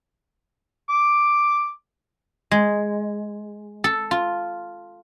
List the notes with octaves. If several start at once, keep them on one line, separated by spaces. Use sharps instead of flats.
D6
G#3
A4
F4